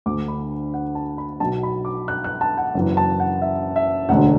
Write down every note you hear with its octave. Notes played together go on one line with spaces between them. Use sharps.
D2 D3 D6
B5
F#5
A5
B5
B1 B2 A5
B5
D6
F#6
F#6
A5
F#5
F#1 F#2 E3
A5
F#5
E5
E5
E1 D2 D3 F#5